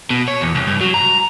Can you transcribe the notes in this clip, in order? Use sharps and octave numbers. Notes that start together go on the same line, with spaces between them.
B2
C#5
E2
C2
G2
F#3
A#5